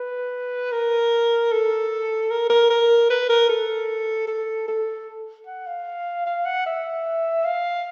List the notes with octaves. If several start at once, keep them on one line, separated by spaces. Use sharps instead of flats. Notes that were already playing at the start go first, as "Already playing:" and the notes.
Already playing: B4
A#4
A4
A#4
A#4
A#4
B4
A#4
A4
A4
A4
F#5
F5
F5
F#5
E5
F5